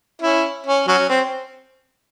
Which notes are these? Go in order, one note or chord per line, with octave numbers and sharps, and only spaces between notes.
C#4 E4
C#4
F#3 C#4
C4